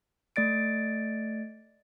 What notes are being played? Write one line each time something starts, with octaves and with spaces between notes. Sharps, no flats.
A3 D5 A6 D7